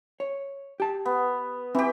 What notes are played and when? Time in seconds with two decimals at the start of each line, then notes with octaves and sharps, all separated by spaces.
0.20 C#5
0.80 G4 A5
1.05 B3
1.75 E3 C4 G4